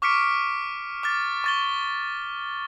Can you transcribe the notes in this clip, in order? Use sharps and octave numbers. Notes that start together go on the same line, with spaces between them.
C#6 D6 F6 B6 C#7 D7
D6 F6 A6
C#6 A6 G7